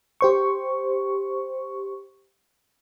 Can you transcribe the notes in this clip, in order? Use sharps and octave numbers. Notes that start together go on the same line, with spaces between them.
G4 C5 C#6